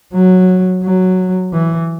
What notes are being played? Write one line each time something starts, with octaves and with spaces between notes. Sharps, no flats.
F#3
F#3
E3